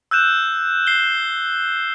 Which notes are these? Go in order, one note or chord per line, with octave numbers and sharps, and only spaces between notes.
E6 F#6 G6 E7
C7 G7